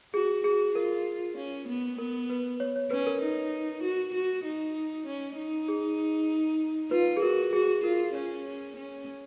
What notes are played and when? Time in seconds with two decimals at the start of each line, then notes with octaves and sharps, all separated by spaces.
0.14 F#4 G#4
0.44 F#4 G#4
0.75 F4 A#4
1.37 C#4
1.68 B3
1.98 B3 A#4
2.30 B4
2.60 C#5
2.76 C#5
2.91 C#4 B4
3.07 A#4
3.22 D#4
3.83 F#4
4.14 F#4
4.45 D#4
5.06 C#4
5.37 D#4
5.68 G#4
6.91 F4 B4
7.17 G#4
7.22 F#4 A#4
7.53 F#4 G#4
7.84 F4 A#4
8.14 C#4 C#5
8.76 C#4